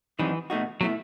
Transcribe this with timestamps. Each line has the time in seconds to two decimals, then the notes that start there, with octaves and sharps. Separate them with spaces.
0.19 F#2 D#3 E3 G3 C4 D#4
0.50 B2 A3 D#4 F#4
0.81 B2 F#3 A3 E4